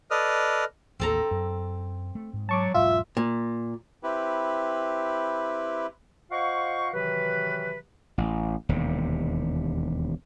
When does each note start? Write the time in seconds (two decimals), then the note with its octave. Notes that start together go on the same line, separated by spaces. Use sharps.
0.11 A4 B4 D5 D#5 D#6 F6
1.00 A1 D#2 A#3 C4 A4 A#5
1.31 F#2
2.15 A3
2.33 G#2
2.49 F#3 A5 C#6 D6
2.74 E1 G#2 F#3 F4 E5
3.17 A#2
4.03 C4 E4 G4 B4
6.31 F4 C5 D#5 F5 F#5 C#6
6.93 C3 D#3 E3 F#3 F#4 B4
8.18 A1
8.69 E1 D#2 C3